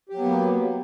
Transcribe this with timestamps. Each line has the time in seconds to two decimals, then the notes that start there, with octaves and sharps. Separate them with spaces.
0.09 G4
0.14 F#3
0.19 B3
0.23 A#3